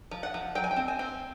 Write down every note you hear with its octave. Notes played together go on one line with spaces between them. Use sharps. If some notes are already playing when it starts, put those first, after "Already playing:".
F3
F#5
F3
F#3 G5
G#5
G5
C4
G#5
C4